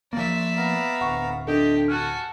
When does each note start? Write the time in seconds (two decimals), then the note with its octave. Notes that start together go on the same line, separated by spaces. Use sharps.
0.13 F3 A#3 D5 E5
0.57 B3 F5 A#5
1.01 D1 F#5 C#6
1.48 D4 F4 G4 A4 D#5 G5
1.88 F#4 A4 G#5 F6 F#6